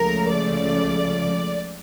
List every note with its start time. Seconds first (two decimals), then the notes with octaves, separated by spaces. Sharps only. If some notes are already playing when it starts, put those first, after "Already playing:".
Already playing: C#2 C#3 F3 A3 A#4
0.31 D5